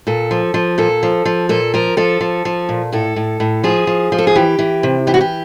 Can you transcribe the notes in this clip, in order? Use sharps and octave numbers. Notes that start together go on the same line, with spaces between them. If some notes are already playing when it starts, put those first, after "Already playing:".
A#2 A4
F3
F3
A#2 A4
F3
F3
A#2 A4
F3 A#4
F3 A4
F3
F3
A#2
A2 A4
A2
A2
F3 G#4
F3
F3
A4
G#4
E3 G4
E3
C3
E3 G4
F#4
G4